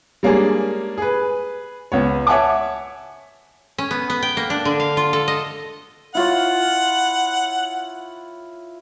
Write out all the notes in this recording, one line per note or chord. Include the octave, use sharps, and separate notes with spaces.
G3 G#3 A#3 C#4 D4 G#4
G#4 B4
C#2 B3 C#5
C#5 E5 F#5 G#5 A5 D6
C#4
B3
B3
G5
A#3
D4
D3
F5
F4
A4
D#5
E4 F4 C#5 F#5